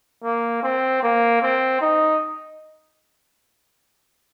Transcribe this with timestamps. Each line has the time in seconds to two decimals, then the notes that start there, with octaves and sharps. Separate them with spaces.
0.24 A#3
0.63 C4
1.03 A#3
1.42 C4
1.81 D#4